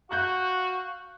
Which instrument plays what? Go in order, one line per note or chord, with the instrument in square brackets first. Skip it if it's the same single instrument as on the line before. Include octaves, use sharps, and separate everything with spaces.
[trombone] F#4 [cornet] F5 [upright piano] C#6 F#6 G6